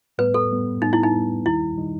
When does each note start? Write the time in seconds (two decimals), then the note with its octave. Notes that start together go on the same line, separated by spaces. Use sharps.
0.18 A2 G3 B3 B4
0.34 A4
0.50 A2 G3 B3
0.82 A2 G3 B3 D#4
0.93 E4
1.03 D#4
1.14 A2 G3 B3
1.46 D#2 D#3 G3 D#4 E4
1.77 D#3 G3 D#4